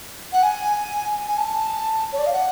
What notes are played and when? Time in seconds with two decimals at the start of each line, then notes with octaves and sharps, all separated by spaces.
0.32 F#5
0.43 G#5
1.27 G#5
1.38 A5
2.12 C#5
2.18 D5
2.26 F5
2.33 F#5